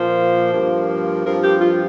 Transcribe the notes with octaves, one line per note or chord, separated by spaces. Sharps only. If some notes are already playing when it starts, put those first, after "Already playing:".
Already playing: A#2 F3 A#3 C5
G2 F3 A#3
G2 F3 C4 A#4
G4
F4